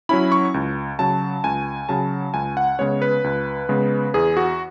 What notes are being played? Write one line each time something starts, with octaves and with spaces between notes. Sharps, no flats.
F#3 C#4 E4 B5
C#6
C#2
C#3 F#3 A5
C#2 G#5
C#3 F#3 A5
C#2 G#5
F#5
C#3 G#3 B3 C#5
B4
C#2
C#3 G#3 B3
E2 G#4
F#4